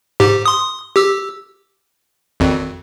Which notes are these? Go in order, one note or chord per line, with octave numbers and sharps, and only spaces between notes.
G#2 G4
C6 D#6
G4 E6
G#1 F2